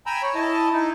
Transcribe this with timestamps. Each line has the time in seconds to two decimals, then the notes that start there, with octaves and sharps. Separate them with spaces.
0.06 G5 G#5 A#5 B5 E6
0.23 C#5
0.35 E4 D#5 A5
0.73 D#4 E4